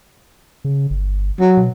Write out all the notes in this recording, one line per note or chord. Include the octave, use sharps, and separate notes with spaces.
C#3
G1
F#3
B2